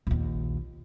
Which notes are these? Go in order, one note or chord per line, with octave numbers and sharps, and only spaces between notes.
A#1 D#2